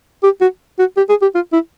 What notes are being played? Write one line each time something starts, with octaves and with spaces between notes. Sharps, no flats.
G4
F#4
F#4
G4
G#4
G4
F4
E4